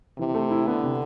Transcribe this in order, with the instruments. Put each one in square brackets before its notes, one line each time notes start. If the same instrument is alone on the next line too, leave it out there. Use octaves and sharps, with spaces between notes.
[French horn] C3 [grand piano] E3
[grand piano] A3
E4
[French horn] D3 [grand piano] B3
[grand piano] C3